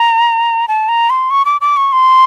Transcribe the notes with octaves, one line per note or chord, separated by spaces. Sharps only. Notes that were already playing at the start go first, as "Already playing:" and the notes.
Already playing: A#5
A5
A#5
C6
C#6
D6
D6
C#6
C6